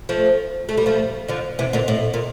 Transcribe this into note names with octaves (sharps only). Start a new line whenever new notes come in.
F3 A3
A3
G3
F3 A3
D3 F3
C3 E3
A#2 D3
A2
A#2